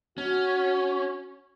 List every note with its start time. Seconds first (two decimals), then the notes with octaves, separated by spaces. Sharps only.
0.18 C#4 F#4